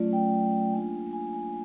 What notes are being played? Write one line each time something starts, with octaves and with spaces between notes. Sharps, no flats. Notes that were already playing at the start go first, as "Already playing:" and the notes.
Already playing: F#3 A3 C#4 F4 D5
G5
A#3 D4 F4 G#5
G#5
G#5